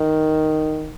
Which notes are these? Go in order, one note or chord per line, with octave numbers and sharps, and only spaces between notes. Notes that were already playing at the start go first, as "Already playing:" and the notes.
Already playing: D#3